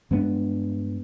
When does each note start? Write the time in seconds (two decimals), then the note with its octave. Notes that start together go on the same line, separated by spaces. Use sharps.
0.11 G2 G#3 B3 D4